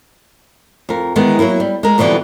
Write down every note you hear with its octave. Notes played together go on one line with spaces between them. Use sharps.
F2 A#4
D#3 E3 G#3 B3
F#3 G#3 A#3 E4
G3
G#3 A#4
F2 B2 D3 E3 G3